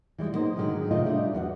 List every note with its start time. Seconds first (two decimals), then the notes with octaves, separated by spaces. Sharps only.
0.18 E3 G3 G#3
0.32 F#3 G3 A#3 B3 D#4 C5
0.56 G#2 B2 D3 D#3 F#3 G#3
0.91 C3 D#3 A3 F4 D#5
1.05 F#3 G3 D4 C5 E5
1.33 E2 F#4 F5 F#5